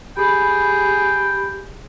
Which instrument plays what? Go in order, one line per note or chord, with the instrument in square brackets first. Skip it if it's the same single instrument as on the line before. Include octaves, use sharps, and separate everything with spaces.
[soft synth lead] G4 [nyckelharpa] G#4 [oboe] G5 [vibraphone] B5